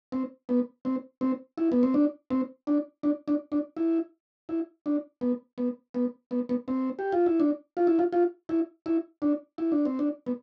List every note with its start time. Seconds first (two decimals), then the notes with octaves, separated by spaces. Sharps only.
0.12 C4
0.49 B3
0.85 C4
1.21 C4
1.58 E4
1.72 B3
1.83 C4
1.94 D4
2.30 C4
2.67 D4
3.03 D4
3.28 D4
3.52 D4
3.77 E4
4.49 E4
4.86 D4
5.21 B3
5.58 B3
5.94 B3
6.31 B3
6.49 B3
6.68 C4
6.99 G4
7.12 F4
7.26 E4
7.40 D4
7.77 F4
7.87 E4
7.99 F4
8.13 F4
8.49 E4
8.86 E4
9.22 D4
9.58 E4
9.72 D4
9.85 C4
9.99 D4
10.26 B3